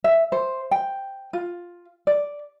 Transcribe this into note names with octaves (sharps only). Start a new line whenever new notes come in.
E5
C5
G5
F4
D5